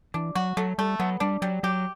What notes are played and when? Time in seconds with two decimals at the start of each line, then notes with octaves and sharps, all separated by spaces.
0.14 E3 D4
0.35 F#3 F#4
0.57 F#3 A3
0.78 G3 A3
0.99 F#3 B3
1.20 G3 D4
1.42 F#3 G3
1.63 F#3 G4